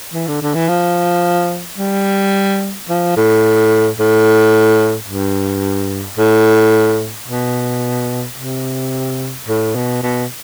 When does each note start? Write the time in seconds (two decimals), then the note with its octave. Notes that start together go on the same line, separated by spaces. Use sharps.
0.14 E3
0.28 D3
0.42 D3
0.54 E3
0.69 F3
1.78 G3
2.89 F3
3.16 A2
3.99 A2
5.08 G2
6.17 A2
7.28 B2
8.38 C3
9.48 A2
9.75 B2
10.03 B2